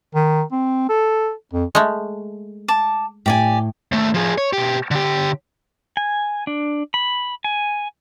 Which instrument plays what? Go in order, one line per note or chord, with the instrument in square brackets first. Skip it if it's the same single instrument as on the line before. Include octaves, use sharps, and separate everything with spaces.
[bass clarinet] D#3
C4
A4
F2
[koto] G#3 A3
[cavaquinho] A5 D6
[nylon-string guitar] A2 G5 [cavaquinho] G4 D5 G#5
[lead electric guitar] D#2 A3
F3 G#4
C#5
B2 G4
D3 G4
[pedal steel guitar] G#5
D4
B5
G#5